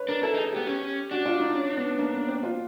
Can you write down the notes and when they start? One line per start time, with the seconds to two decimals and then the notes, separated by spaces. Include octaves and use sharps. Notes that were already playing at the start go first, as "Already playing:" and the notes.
Already playing: B4 C#5
0.08 D4 A#4
0.23 E4 A4
0.34 D#4
0.38 G#4
0.53 B3 G4
0.67 C#4 G4
1.11 D4 F#4
1.26 F4
1.40 D#4
1.55 C#4
1.77 B3
1.99 A#3
2.14 B3
2.28 C4
2.43 F4